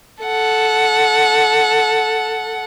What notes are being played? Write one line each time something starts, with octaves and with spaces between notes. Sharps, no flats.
A4 F#5